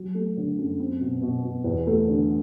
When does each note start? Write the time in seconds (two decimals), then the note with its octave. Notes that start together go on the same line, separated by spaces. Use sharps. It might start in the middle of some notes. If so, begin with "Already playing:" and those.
Already playing: F#3
0.15 A3
0.37 D3
0.58 F#2
0.80 C4
1.00 B2
1.22 B2
1.43 B2
1.64 E2
1.87 A3
2.08 D3